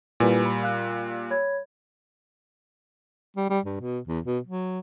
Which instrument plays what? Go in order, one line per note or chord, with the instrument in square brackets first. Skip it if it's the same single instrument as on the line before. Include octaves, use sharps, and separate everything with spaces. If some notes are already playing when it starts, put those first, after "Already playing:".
[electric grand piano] A#2 G3 [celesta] E4 B4 G#5
[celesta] B5
F5 F#6
C#5 B5 G#6
[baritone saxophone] G3
G3
G2
B2
E2
B2
F#3